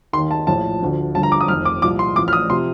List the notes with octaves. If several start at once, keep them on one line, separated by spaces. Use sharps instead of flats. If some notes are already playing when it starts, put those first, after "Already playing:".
D#2 D#3 C6
A5
A#1 A2 F3 A5
D2 D3 F3
G1 G2 D3 F3 A5
A#5
D6
D#6
F1 F2 D#3 F6
D6
C2 A#2 F3 D6
C6
A1 A2 F3 D6
F6
D#6
C3 F3 C6